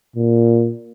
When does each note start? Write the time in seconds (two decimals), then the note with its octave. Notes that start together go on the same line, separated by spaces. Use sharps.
0.16 A#2